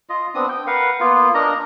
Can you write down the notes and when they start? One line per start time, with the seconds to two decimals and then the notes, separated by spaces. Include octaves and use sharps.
0.09 F4 D#5
0.35 B3 C4 D4 D#6
0.49 G5
0.67 A#4 B4 F5 F#5
1.00 A#3 B3 F4
1.35 D4 A#4 D#5 A#5